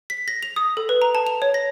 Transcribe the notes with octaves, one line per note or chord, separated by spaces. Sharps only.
B6
A#6
F7
D#6
A4
B4
A#5
A5
F7
C#5
A#6